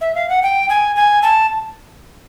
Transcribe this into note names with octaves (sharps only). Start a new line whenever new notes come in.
E5
F5
F#5
G5
G#5
G#5
A5